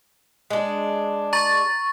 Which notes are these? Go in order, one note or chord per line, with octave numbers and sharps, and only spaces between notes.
G#3 D4
A#5 C#6 A6